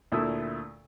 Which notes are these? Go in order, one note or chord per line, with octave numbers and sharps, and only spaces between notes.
D2 A#2 A3 E4 D#6 E6